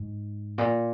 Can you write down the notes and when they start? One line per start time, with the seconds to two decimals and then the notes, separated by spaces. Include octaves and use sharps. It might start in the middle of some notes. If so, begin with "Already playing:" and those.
Already playing: G#2
0.58 A#2